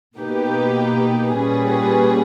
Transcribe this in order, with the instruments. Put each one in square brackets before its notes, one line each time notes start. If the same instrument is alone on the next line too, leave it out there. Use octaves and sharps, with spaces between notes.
[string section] B2 A#3 D#4 G4 B4
A#2 G3 C#4 G#4 B4